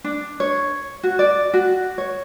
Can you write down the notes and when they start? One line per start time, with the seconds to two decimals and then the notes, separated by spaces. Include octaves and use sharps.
0.04 D4
0.40 C#5
1.03 F#4
1.19 D5
1.54 F#4
1.98 C#5